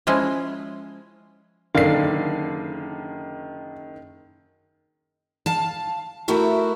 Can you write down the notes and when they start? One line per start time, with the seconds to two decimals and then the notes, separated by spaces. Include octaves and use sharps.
0.07 F3 G#3 C#4 E4
1.75 F#1 D3 D#3 A#4 D5 F5 C7
5.46 F5 A5
6.28 A3 E4 F#4 A#4 E5